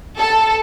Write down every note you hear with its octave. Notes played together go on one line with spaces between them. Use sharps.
A4